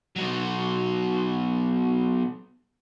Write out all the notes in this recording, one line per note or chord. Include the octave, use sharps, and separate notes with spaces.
B2 F#3